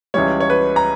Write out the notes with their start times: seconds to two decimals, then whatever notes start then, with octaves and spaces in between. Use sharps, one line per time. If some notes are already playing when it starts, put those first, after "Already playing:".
0.14 C#2 C#3 E3 G3 C#5
0.40 C#5
0.50 B4
0.76 A#5